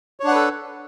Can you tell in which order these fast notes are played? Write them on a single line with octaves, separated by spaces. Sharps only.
C#5 D4 F#5 B4 A4